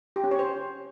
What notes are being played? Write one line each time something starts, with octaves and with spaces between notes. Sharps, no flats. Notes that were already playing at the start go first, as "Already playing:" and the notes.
G4
C#4
C#5
C5